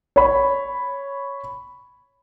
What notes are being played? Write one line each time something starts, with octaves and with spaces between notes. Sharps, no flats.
C#5 B5